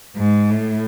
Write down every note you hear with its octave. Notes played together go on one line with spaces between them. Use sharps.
G#2
A2